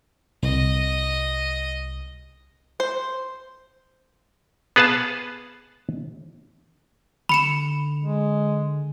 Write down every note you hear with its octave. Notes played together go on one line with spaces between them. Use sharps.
C2 D#5
C5
B3 G#4 B4 F5 A5
D3 B5 C#7 E7
G#3